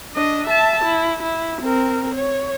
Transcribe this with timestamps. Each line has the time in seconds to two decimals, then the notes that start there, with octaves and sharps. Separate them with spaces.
0.14 D4 D#5
0.47 E5 A5
0.84 E4
1.23 E4
1.61 C4 A#4
2.15 C#5